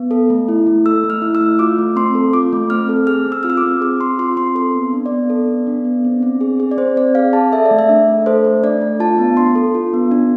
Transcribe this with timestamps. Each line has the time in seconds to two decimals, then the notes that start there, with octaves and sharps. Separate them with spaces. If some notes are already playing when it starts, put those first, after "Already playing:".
Already playing: B3
0.11 A4
0.30 A3
0.48 E4
0.67 A3
0.86 A4 E6
1.04 A3
1.10 F6
1.22 E4
1.35 E6
1.41 A3
1.59 F4 D6
1.78 A3
1.96 C4 C6
2.15 A4
2.33 F4 D6
2.53 A3
2.70 C4 F6
2.89 A4
3.07 G#4 F6
3.27 C4
3.32 E6
3.43 F4 F6
3.50 E6
3.57 D6
3.63 C4
3.81 G#4 D6
4.01 C4 C6
4.19 F4 C6
4.37 C4 C6
4.55 A4 C6
4.75 B3
4.93 D4
5.06 D5
5.12 B3
5.30 A4
5.49 B3
5.67 D4
5.85 B3
6.05 C4
6.23 C4
6.41 G#4
6.60 G#4
6.71 D5
6.77 C4 C5
6.96 C4 D5
7.15 G#4 F5
7.33 G#4 A5
7.52 A4 E5
7.65 D5
7.71 A3
7.79 E5
7.89 D4
8.08 A3
8.26 A4 C5
8.45 A3
8.63 D4 D5
8.81 A3
9.00 F4 A5
9.18 B3
9.37 D4 C6
9.55 A4
9.75 F4
9.94 B3
10.11 D4